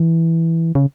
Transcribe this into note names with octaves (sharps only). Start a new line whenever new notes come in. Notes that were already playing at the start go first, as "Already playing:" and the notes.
Already playing: E3
C#3